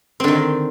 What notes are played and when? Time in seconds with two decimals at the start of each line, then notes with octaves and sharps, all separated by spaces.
0.20 C4
0.24 D3
0.28 D#3